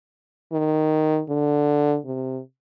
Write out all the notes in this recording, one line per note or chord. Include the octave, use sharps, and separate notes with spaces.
D#3
D3
C3